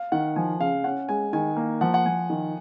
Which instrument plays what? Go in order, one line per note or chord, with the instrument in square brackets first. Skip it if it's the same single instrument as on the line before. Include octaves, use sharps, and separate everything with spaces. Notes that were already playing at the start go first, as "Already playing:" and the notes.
Already playing: [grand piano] F5
[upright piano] D#3 [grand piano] F#5
[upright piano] F3 [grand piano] G#5
[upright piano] C#3 [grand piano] F5
[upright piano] C#4 [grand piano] F#5
[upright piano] G#3 [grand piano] G#5
[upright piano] D#3 [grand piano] G#5
[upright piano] A#3
[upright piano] F3 [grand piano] F#5
[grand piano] F#5
[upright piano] F3 [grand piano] G#5
[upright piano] D#3